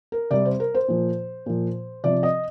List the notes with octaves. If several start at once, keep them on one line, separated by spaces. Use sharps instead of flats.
A#4
C3 G3 D5
C5
A#4
C5
A#2 F3
A#2 F3
C3 F3 D5
D#5